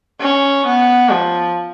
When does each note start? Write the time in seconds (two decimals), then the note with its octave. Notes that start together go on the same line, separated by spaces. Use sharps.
0.20 C#4
0.66 B3
1.10 F3